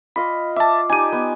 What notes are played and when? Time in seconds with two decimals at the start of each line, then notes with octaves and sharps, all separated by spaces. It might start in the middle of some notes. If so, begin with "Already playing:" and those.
0.16 F4 D#5 F5 B5
0.56 E5 A5 D6
0.90 D#4 G4 G#5 A5 D#7
1.12 B3 G5